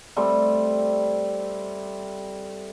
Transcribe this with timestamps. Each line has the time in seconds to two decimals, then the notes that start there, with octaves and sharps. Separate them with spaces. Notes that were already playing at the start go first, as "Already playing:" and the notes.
0.16 G3 A3 C4